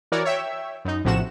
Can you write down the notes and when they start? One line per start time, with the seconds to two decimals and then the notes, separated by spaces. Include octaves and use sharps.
0.12 E3 F#4 A#4 C#5 D5
0.25 C#5 E5 G5
0.85 F#2 D#4
1.04 A#1 A2 C3 F3 F#4 E7